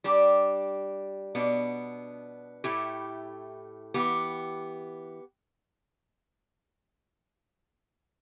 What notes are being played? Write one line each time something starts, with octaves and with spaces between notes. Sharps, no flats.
G3 D4 G4
B2 B3 D4
A2 A3 E4 G4
E3 B3 G4